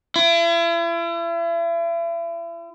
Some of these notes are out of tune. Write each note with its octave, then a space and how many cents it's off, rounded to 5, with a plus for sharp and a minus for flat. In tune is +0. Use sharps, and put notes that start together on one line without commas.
E4 +40